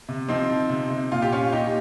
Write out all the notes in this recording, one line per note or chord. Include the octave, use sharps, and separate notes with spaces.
C3
F3 C4 D#4
F3
C3
C3
A#2 F4
G4
A#2 C#4 F4
A#2 D#4 G4